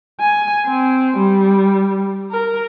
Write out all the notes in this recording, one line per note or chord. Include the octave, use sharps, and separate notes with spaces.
G#5
C4
G3
A#4